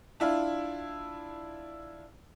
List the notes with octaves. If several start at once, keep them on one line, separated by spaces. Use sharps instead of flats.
D4 E4 F4